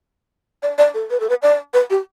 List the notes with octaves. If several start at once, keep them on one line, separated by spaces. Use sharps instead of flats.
D5
D5
A4
B4
A4
B4
D5
B4
G4